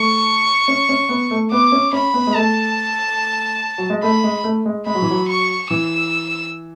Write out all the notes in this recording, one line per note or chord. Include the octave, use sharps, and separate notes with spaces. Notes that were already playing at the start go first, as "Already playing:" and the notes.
Already playing: A3 C#6
C#4
C#4
B3
A3
B3 D6
C#4
C#4 B5
B3
G#3
A3 A5
F#3
G#3
A3 B5
G#3
A3
G#3
G#3 B5
F#3
E3
F#3
C#6
E3 E6